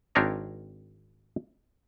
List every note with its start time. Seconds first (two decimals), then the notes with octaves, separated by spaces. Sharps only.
0.15 G#1 C4 D4 A#4 C#5 D#5